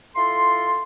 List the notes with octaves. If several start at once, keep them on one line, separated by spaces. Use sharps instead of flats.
E4 F4 A4 C6